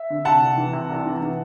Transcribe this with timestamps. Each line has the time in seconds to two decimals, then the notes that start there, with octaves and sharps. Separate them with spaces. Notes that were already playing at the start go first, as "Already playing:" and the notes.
Already playing: E5
0.10 D3
0.25 C3 F#5 A5
0.42 C2
0.57 E3
0.73 C3
0.90 C2
1.06 E3
1.21 E3